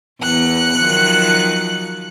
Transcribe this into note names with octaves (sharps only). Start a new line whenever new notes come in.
E2 F#6 C#7
D#3 F3 F#3